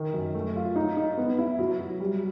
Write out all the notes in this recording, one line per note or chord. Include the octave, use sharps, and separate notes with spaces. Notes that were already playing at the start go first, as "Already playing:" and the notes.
Already playing: D#3
F#2
A3
F4
D#4
D#4
B3
E4
F#3
F#3
G3